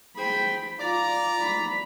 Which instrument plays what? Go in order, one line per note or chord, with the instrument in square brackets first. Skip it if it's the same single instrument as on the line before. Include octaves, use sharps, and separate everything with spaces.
[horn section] G#4 C5 G5 [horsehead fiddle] B5
[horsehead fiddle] F4 [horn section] D5 A#5
[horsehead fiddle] B5